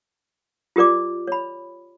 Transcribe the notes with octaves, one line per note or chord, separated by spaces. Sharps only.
F4 G4 A#4 D5 D6
C#5 B5